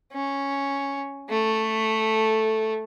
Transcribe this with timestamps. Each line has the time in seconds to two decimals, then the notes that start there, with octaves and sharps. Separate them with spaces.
0.13 C#4
1.30 A3